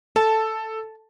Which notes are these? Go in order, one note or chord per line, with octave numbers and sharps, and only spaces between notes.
A4 A5